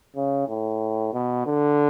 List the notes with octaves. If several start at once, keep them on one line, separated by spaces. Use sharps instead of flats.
C#3
A2
B2
D3